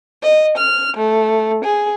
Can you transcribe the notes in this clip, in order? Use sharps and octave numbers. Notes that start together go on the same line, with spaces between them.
D#5
F6
A3
G#4